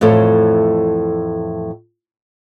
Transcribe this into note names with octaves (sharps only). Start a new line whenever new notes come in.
F2 A2 E3 A4 C#5